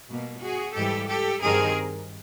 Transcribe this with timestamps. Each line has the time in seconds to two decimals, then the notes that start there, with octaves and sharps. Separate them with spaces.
0.08 B2 G3 A#3
0.41 F#4 G#4
0.75 G#2 E3 G3 G4 A4
1.08 G4 A4
1.42 G2 D#3 G3 C4 G#4 A#4